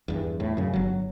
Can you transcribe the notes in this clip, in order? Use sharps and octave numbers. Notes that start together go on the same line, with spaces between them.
E2 G2
A2
F#2 C#3
G1 F#3